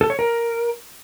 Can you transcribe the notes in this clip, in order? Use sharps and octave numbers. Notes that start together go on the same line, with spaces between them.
A4
C#5
A#4